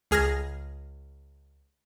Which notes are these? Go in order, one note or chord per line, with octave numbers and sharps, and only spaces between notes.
C#2 G#4 F6 G#6 A#6